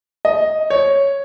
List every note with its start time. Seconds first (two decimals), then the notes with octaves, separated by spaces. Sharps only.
0.25 D#5
0.70 C#5